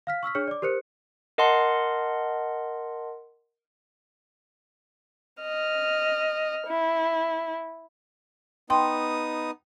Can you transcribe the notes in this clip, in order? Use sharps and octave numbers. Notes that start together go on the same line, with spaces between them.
F5 F6 B6
C#6 E6 F6 B6
D4 G#4 C#5 F6 C#7
D5 D6
G4 A#4 C5 F#6 C#7
A#4 D#5 F#5 A5 C6
D#5 F6
E4
B3 D#4 G5 C6 D#6